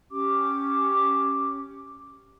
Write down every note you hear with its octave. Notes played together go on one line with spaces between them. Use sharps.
C#4 G4 D6